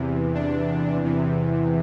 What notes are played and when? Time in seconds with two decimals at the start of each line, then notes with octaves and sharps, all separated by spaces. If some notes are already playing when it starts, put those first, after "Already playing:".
Already playing: E2 C3 E3
0.35 D4
1.03 E2 C3 E3